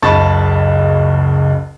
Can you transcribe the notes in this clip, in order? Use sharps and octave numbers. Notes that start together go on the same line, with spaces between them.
F#1 C#2 A5 B5 C#6 A6